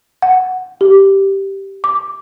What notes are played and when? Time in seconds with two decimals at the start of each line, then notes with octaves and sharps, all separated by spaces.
0.22 F#5
0.81 G4
1.84 D6